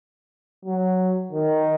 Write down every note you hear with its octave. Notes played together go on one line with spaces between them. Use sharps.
F#3
D#3